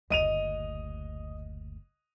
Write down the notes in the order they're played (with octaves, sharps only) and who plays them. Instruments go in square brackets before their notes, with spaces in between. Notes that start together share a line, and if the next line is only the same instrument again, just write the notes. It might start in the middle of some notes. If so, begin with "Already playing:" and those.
[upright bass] F#1 D2 [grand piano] D#5 D#7 F7